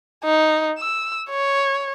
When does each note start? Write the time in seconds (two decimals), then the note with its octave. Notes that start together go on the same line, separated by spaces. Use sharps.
0.24 D#4
0.79 E6
1.30 C#5